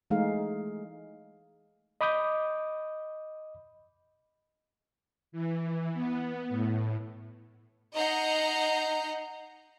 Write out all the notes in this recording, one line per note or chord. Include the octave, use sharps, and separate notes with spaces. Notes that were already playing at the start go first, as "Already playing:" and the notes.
E3 G#3 A3 D#4 G#4 F5
D#5 B5 D6 D#6 G6
E3
B3
A2
D#4 D#5 F#5 A#5 G6 C7